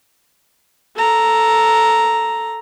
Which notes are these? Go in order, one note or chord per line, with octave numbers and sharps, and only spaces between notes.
A4 A#5